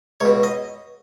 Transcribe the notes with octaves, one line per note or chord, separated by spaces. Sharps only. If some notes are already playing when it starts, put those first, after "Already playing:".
C#2 B2 C#5
D#5